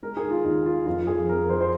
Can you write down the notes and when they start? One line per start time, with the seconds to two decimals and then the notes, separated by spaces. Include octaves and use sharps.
0.03 G#3 A#4
0.17 G#4
0.23 D#3
0.30 F4
0.44 D#2 D#4
0.66 D#3 F4
0.86 F2 F4
1.07 F2 G#4
1.29 F2 A#4
1.49 F2 C5
1.61 C5